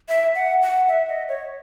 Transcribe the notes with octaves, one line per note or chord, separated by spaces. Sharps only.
E5
F#5
F#5
E5
D#5
C#5